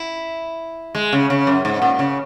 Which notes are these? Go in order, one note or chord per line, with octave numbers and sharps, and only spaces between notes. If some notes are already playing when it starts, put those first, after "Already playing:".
Already playing: E4
G#3
C#3
C#3
F#2
G#2
A#2
C#3